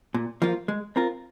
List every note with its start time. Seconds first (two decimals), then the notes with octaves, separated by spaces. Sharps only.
0.14 A#2
0.42 F3 A#3 F4
0.68 G#3
0.96 C4 F4 A#4